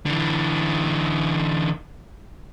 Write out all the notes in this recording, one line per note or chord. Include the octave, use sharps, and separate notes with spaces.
D3 E3